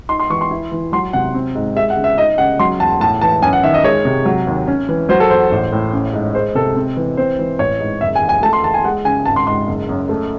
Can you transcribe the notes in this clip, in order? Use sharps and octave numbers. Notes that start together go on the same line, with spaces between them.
D#4 C6
C6
E3 C#6
C6
E4
E3
F#3 C6
C3 F#5
C4
G#2
G#3 E5
F#5
C#3
E5
D#4 D#5
C#3 F#5
F#3 C6
E2 A5
A2 A5
E3 A5
F#2 G#5
F#5
D#3 E5
D#5
G#3 C#5
C3
F#3
D#2
C#4
E3
F#3 C5
A4
E2 C5
A1
A2
C#4
G#2
G#3 C5
C3 A4
C4
E3
C4 C5
E3
A1 C#5
G#2
F#1 E5
G#5
E2
G#5
A3 A5
C6
E2 A5
G#5
G#3 F#5
C#3 G#5
G#1 A5
C6
G#2 C6
F#1
F#2
A3